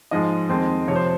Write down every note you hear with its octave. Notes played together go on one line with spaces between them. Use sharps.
G#2 F3 G#3 D#5
F2 D#3 G#3 C4
F2 C3 F3 C#5
C5